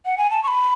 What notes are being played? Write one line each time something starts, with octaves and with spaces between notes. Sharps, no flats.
F#5
G#5
A5
C#6
B5